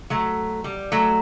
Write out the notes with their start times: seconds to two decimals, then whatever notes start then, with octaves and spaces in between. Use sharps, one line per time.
0.10 F#3 A3
0.64 G3
0.92 F#3 A3